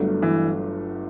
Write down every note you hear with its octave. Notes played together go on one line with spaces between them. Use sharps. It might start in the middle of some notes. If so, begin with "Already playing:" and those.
Already playing: G1 G2 F#3 A3 D4
E3